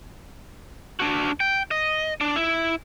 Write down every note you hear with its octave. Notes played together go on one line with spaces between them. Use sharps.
D4 F#4
G5
D#5
D4
E4